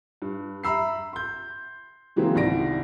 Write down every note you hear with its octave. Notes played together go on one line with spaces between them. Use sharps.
G2
E5 A#5 B5 E6 C7
C6 G6
C#3 E3 F#3 G#3 A#3 C4
G1 C2 D#3 D5 A#6 D7